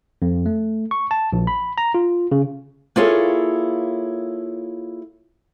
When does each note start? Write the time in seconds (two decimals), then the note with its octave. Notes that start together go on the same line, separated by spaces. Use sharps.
0.22 F2
0.46 A3
0.91 C#6
1.11 A5
1.33 A#1
1.47 B5
1.78 A#5
1.94 F4
2.32 C#3
2.96 A#3 E4 F4 G#4 A4 C#5